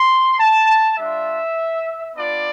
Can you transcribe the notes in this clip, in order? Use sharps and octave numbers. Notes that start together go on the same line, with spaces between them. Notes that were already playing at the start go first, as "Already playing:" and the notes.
Already playing: C6
A5
G3 D4 F4 E5
B3 D4 F4 D5